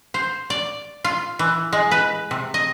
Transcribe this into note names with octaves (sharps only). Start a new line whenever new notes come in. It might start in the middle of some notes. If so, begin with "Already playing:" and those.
C5
D5
F4
E3
G#3
B4
C3
D#5